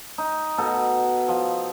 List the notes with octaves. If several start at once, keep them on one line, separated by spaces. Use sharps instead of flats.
D#4
B2 A4 F#5
F3